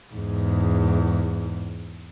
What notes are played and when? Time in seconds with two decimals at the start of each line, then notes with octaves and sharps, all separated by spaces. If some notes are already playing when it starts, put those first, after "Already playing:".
0.13 E2 G#2